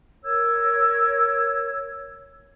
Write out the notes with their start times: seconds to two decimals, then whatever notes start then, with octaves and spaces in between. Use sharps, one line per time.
0.23 A#4 C#5 E6 G#6